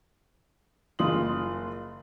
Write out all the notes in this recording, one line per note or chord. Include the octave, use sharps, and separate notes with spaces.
F#1 F4 C6 D#6 F#7